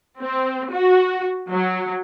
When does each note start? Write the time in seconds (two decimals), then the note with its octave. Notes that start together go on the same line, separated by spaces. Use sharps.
0.20 C4
0.73 F#4
1.49 F#3